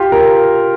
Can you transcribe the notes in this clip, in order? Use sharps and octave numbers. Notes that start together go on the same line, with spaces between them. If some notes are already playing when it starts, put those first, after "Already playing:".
Already playing: F4 G4
A#4